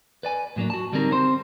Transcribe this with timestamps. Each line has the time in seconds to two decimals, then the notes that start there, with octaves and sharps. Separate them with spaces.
0.23 B4 D5 G#5
0.56 A2 F#3 A#3 D4
0.70 F#4 A5
0.93 D3 G3 C4 D4 D#4 A#4
1.12 C4 C5 C6